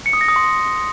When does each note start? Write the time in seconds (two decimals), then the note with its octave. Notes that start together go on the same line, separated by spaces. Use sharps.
0.06 C#7
0.13 D#6
0.21 A#6
0.28 D#6
0.36 C6